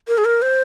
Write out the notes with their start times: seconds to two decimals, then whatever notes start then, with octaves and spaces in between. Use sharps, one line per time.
0.08 A#4
0.18 G#4
0.25 A#4
0.42 C5